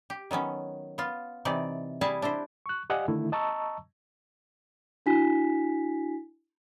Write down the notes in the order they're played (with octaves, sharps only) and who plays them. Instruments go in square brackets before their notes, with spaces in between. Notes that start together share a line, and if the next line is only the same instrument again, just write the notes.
[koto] G4
D#3 F#3 B3 C#4
B3 F4
C3 E3 D#4 D5
G3 E4 G#4 E5 G#5 A5
D4 E4 G4 C5
[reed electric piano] C#6 F#6
G4 D5 D#5 F5 F#5 G#5
D3 D#3 A3 E4
D#5 A5 A#5 C#6 E6
[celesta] D4 E4 F#4 G#5 B6